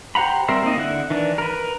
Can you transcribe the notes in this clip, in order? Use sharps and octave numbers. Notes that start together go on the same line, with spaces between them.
G4 C5 F#5 A#5 B5
G3 C4 A#4 C5 E5
A#3 C4 D#4 D#5
D3 E4 F#5
D#3 E3 D4
A#4 B4